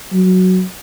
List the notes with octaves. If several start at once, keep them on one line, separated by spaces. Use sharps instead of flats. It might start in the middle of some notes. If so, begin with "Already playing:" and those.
F#3